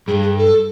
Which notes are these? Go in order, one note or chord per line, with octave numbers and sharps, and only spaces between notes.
G2 G#4
G#4
A4